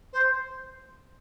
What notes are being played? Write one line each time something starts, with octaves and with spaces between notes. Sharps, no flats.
C5